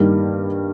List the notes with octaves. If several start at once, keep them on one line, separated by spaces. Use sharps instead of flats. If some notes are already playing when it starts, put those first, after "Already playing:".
Already playing: G2 D#3 G3 A#3